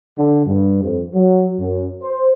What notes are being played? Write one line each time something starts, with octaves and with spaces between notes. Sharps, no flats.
D3
G2
F2
F#3
F#2
C5